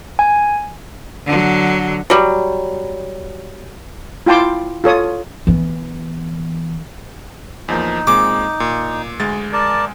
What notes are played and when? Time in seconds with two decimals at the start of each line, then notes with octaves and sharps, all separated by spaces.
0.19 G#5
1.26 D3 F#3
2.10 F#3 G3
4.26 E4 F4 G5 A5 C6 D6
4.84 F4 A4 C#5 D#6
5.47 E3 B3
7.68 E2 F3 A#3 D#4
8.07 A#2 G#3 C4 D6
8.60 A#2
9.20 D2 G#3 A6
9.53 A#4 D5 A5